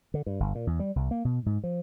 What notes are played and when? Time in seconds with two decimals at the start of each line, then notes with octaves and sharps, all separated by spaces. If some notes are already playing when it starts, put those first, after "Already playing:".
0.14 D3
0.26 G2
0.40 G1
0.55 A#2
0.67 E2
0.79 G3
0.96 C2
1.11 A#3
1.25 B2
1.46 G#2
1.64 F3